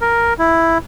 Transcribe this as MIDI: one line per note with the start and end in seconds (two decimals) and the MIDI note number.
0.01 0.33 70
0.39 0.78 64